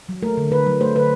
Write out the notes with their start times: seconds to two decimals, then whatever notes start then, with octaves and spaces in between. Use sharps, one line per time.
0.09 F#3
0.23 A3 A#4
0.37 D3
0.51 D3 B4
0.67 F#3
0.81 A3 C5
0.95 D3 B4